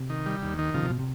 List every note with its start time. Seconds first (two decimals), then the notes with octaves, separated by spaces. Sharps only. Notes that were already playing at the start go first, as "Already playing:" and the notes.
Already playing: C3
0.10 D#3
0.26 G3
0.42 D#2
0.59 D#3
0.74 C#3 F3
0.83 C3
0.90 B2
0.99 C3